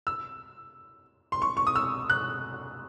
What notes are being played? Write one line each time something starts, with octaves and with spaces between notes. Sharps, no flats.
E6
C6
C#6
C#6
D#6
E6
F#6